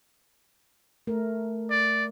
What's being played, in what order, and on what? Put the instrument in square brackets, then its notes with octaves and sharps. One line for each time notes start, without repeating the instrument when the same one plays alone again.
[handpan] A3 A#4
[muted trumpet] D5